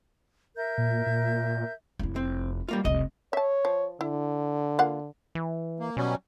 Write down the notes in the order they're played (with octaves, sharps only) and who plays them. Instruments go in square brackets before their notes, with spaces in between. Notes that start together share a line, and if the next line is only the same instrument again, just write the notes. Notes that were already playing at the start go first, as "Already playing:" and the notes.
[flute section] A#4 E5 G6
[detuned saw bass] A#2
A#2
[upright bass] F1 E4
[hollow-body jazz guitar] C4
G3 A#3 F4
[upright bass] F1 C2 [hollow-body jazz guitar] D#5
[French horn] C#5 [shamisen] E5 A5
[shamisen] F3
[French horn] D3 [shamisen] E4
[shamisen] A#3 F4 F#5
[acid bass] E3
[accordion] A#3
[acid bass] B2 [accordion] F#3 G3 C#4